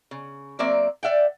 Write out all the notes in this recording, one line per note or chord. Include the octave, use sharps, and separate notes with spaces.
C#3
F#3 A#3 C4 D5 E5
D5 E5 F#5 G5